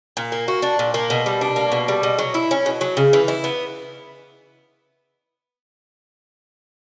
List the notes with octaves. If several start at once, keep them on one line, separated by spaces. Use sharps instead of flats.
A#2
A#3
F#4
D4
A#2
A#3
B2
G3
D4
A#3
B2
G3
B2
F#3
E4
C#4
B2
F#3
C#3
E3
E4
B3